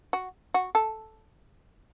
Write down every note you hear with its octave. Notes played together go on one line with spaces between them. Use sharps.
F#4
F#4
A4